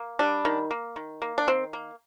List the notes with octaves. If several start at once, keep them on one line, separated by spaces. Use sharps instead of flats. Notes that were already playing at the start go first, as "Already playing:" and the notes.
Already playing: A#3
G3 D4
D#3
A#3
D#3
A#3
D4
D#3 C4
A#3